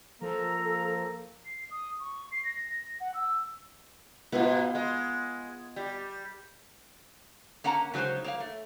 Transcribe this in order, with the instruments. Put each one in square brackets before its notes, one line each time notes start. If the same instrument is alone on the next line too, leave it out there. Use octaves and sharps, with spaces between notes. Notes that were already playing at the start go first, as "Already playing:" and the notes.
[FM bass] F3 [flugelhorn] A#3 [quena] A4 [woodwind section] A#5
[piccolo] C7
D#6
C#6
C7
A#6
F#5
E6
[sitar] G#2 B2 [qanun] B3 F4
[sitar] G#3
G3
[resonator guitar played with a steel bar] A#3 C#4 F#5 A5 A#5
C#3 F#3 G#3 D#4 C5
A#3 C#5 F5
A3